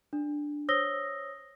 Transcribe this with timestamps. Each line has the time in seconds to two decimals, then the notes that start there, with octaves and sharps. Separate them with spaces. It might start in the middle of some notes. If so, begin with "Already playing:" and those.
0.13 D4
0.68 C5 C#5 D#6 E6 A#6 G7